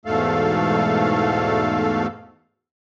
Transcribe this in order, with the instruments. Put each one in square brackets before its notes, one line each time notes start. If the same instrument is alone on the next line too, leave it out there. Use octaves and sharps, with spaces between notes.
[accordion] E2 G#2 B2 A3 A4 F5